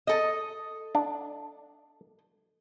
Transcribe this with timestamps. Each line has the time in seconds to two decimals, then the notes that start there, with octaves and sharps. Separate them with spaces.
0.07 A4 D#5
0.95 D4